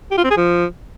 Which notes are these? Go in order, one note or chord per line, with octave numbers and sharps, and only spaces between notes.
G4
F4
C4
G#4
F3